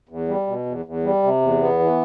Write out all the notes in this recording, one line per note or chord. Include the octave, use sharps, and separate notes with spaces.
E2
G3
B2
E2
E2
G3
C3
E2
B3
E3